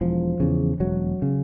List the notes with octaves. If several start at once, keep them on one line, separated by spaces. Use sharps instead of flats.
E1 F3
E2 C#3
E1 F#3
C#3